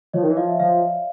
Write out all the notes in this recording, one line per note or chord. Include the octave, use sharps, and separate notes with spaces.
F3 C#5 D#5
D#3
E3
F3 D#5 F5
E5
F3 D#5 F5